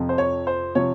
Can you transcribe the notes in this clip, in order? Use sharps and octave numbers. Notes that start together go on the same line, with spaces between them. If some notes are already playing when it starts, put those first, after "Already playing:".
Already playing: F2 C3 F3
C5
C#5
C5
C3 F3 C#5